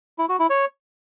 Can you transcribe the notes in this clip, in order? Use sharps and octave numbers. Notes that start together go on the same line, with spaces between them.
E4
F#4
E4
C#5